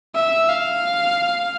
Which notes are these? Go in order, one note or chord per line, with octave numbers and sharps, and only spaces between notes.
E5
F5